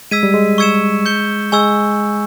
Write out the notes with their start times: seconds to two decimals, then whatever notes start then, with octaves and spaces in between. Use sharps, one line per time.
0.11 G#3 E6 G#6 B6 D#7
0.23 G3
0.34 G#3
0.58 C#6 E6 G#6 C#7 E7
1.06 G6 C#7 G7
1.52 G#3 G#5 C#6 E6 G#6